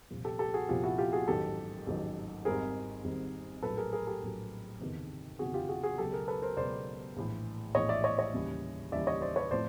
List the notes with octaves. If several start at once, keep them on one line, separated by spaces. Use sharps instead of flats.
C2 A#2 F3
G4 A4
G4 A4
F#4 G#4
C2 A#2 F3 F4 G4
E4 F#4
F4 G4
F#4 G#4
A1 G#2 D#3 F#3 G4 A4
A1 G#2 D#3 F#3
G#1 G#2 D#3 G3 C4 G#4 A#4
G#1 G#2 D#3 G3 C4
A#1 A2 F#3 A4 B4
G#4 A#4
G#4 A#4
G4 A4
A#1 A2 F#3
F#1 E2 C3 D#3
F#1 E2 C3 D#3 F#4 G#4
F4 G4
F#4 G#4
F#4 G#4
C#2 B2 F#3 B3 G4 A4
G#4 A#4
A4 B4
A#4 C5
C#2 B2 F#3 B3 C5 D5
A#1 A2 E3
A#1 A2 E3 C#5 D#5
D5 E5
C#5 D#5
C#5 D#5
D#2 C#3 E3 G3
D#2 C#3 E3 G3 D5 E5
C#5 D#5
C5 D5
B4 C#5
A2 F3 A3 C4 C5 D5